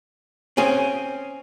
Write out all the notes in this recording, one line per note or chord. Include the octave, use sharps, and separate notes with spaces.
C4 C#4 G#4